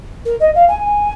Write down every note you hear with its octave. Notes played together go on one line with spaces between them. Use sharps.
A#4
D#5
F5
G#5